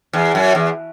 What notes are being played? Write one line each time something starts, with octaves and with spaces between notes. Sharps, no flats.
E2
F#2
E2